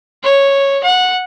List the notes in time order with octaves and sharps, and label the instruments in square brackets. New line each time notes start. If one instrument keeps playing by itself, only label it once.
[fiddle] C#5
F#5